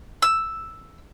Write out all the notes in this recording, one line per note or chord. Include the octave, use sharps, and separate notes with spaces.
E6